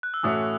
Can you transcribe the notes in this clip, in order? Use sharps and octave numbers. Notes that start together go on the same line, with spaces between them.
F#6
E6
A2 E3 A3 C#4 F#4 D#6